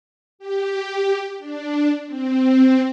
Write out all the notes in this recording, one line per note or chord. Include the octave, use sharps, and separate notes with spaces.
G4
D4
C4